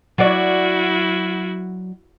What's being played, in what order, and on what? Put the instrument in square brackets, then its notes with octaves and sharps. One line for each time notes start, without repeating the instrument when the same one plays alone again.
[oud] F#3 D5 [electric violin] E4 F#4